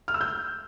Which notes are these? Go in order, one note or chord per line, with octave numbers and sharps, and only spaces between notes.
F6
E6
G6